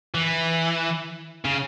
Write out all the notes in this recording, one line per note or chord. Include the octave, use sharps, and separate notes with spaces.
E3
C#3